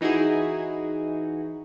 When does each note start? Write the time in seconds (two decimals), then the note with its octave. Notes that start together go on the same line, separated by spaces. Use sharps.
0.01 E3 D#4 E4 F#4 G#4